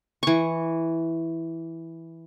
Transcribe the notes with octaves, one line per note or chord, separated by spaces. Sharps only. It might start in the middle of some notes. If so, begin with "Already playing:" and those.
E3 C#6